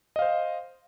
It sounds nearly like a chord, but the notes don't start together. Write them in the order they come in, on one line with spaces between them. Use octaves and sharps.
D#5 F5 C5